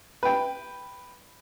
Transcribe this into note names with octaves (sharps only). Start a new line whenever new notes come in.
B4 G5